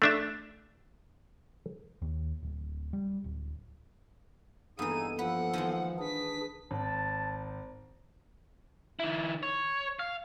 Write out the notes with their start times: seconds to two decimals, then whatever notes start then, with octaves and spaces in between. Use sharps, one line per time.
0.02 A3 D4 E5
2.02 D#2
2.43 D1
2.93 G3
3.24 D1
4.79 G2 E3 A#3 B3 D#4 G#4 A4 D#7
5.19 F3 B4 F#5
5.53 D#3 E3 G#3
5.99 D4 G#4 B4 B6
6.71 G#1 A5
8.99 D#3 E4
9.43 C#5
9.99 F5